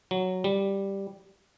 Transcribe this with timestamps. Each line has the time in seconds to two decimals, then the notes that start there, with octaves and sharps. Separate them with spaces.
0.11 F#3
0.44 G3